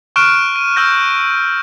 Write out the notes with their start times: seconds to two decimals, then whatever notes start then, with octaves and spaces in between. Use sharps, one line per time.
0.16 C#6 F6 F#6 D7 E7
0.56 D#7
0.76 E6 F6 G6 A#6